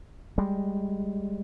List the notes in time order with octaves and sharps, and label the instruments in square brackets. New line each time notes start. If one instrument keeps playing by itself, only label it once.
[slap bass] G3 G#3